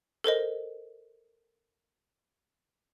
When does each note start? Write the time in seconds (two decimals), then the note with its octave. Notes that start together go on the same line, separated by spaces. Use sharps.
0.24 A4 A#4 C5 D#5